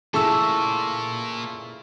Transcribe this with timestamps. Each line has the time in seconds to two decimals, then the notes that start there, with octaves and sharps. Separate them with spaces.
0.14 A#2 C#3 E3 A3 A5 C#6 E6